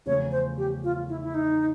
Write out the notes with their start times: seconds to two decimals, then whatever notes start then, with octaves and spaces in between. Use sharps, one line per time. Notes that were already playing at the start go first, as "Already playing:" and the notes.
0.06 E2 C#3 F3 A3 C#4 C#5
0.32 C5
0.58 G4
0.84 F4
1.09 E4
1.23 E4
1.34 D#4